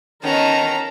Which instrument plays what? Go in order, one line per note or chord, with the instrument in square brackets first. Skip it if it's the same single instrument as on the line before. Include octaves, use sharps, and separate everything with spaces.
[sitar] D#3 B3 [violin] C#4 A#5 [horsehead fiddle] A#4 A5